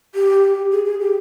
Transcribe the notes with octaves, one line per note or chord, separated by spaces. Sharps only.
G4
G#4
G#4
G4